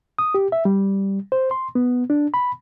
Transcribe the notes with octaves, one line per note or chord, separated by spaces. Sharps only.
D#6
G4
E5
G3
C5
C6
B3
D4
B5